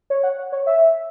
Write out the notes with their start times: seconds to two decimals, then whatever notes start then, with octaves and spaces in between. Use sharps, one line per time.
0.10 C#5
0.23 F#5
0.52 C#5
0.67 E5